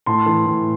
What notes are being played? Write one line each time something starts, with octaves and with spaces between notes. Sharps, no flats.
A2 A5 C6
E3
A2